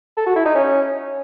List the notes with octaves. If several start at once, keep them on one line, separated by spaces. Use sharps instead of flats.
A4
F#4
E4
D#4
C#4